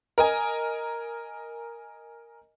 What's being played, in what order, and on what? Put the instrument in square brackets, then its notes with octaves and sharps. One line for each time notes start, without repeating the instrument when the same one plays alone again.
[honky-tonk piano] A#4 D#5 G#5